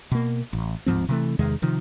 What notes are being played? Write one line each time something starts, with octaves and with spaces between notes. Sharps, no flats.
B2 A#3
A1
D1 G#2 F3 C4
C3 E3 A3
E2 C3 D#3 G#3
C3 D#3 F3